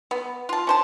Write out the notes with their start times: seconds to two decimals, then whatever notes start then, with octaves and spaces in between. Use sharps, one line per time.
0.11 B3
0.49 F4 A5
0.67 C#4 C5 A5